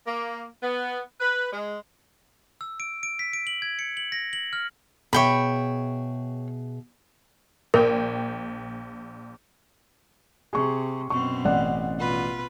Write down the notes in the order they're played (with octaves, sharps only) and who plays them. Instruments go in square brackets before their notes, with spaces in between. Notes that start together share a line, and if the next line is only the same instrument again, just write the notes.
[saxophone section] A#3
B3
B4
G#3
[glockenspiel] E6
D7
D7
B6
D7
F#7
G#6
C#7
F#7
A#6
F#7
F6
[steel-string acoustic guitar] B2 G#4 E5 [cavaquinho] C#5 G5 B5
[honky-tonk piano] A#1 G5 [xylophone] A#4
[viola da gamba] C3 [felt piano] G#4 C#6
[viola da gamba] F#2 B2 C4 [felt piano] C#6
[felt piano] A1 D5 F#5
[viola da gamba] B2 F4 B4